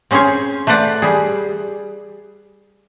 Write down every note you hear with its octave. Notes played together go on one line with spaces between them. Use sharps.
C4 C#4 G#4 C5 C#5
A3 B4 C5 D5 F#5
G3 G#4